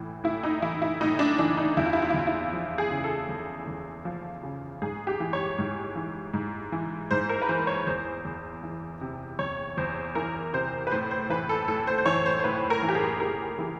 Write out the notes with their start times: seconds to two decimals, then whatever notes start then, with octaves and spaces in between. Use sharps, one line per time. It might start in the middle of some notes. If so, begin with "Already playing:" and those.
Already playing: A2 E3
0.24 A2 E4
0.43 D#4
0.62 E3 E4
0.82 E4
1.00 A2 D#4
1.19 D4
1.38 E3 D4
1.57 D#4
1.77 E2 E4
1.86 F4
1.93 E4
2.02 F4
2.10 E4
2.14 E2 F4
2.27 E4
2.53 F3
2.78 G#4
2.90 C#3
3.04 A4
3.29 E2
3.67 E2
4.05 F3
4.43 C#3
4.82 G#2 G#4
5.07 G4
5.20 E3
5.33 C#5
5.58 G#2
5.95 E3
6.34 G#2
6.72 E3
7.11 G#2 C5
7.29 A#4
7.42 B4
7.49 E3 C5
7.67 C#5
7.87 E2 C5
8.25 E2
8.63 E3
9.01 C3
9.39 E2 C#5
9.77 E2 C5
10.15 E3 A#4
10.53 C3 C5
10.87 B4
10.91 A2 C5
11.11 C5
11.30 E3 B4
11.49 A4
11.68 A2 A4
11.87 C5
11.98 C5
12.06 E3 C#5
12.26 C5
12.40 C5
12.44 A2 B4
12.70 A#4
12.83 E3
12.89 G4
12.95 G#4
13.20 A2 A#4
13.59 E3